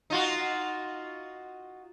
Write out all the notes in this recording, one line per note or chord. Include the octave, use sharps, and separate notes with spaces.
D#4 F4 F#4